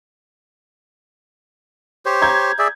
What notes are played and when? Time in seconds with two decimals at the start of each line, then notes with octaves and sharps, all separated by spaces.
2.06 G4 C5 C#5
2.22 A#5 G6 G#6
2.59 G#4 D5 E5